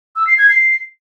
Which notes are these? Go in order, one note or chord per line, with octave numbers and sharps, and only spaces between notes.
E6
C7
G#6
C7